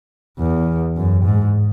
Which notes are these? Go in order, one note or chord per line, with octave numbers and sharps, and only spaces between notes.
E2
F#2
G#2